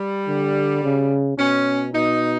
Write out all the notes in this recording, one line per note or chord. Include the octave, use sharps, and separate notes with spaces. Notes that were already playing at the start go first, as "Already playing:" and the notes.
Already playing: G3
D3
C#3
B2 C#4
B2 D#4